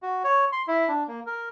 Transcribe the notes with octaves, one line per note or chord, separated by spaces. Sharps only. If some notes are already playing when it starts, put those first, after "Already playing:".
F#4
C#5
C6
E4
D4
A#3
A#4